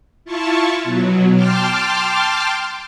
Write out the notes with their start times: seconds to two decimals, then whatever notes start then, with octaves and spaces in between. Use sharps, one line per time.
0.25 E4 F4 A5 C#6
0.83 B2 F#3
1.34 G5 A5 C6 D6 F6